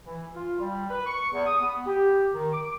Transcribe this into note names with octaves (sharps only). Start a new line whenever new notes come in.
E3
F4
G3
B4
C#6
E2
D#6
B3
G4
D#3
D6